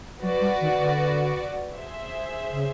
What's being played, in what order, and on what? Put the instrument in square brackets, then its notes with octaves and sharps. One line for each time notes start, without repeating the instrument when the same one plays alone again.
[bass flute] F#3 [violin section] F#4 B4 D5
[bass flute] G3
D#3
D3
[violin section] G#4 C5 E5
[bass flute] C#3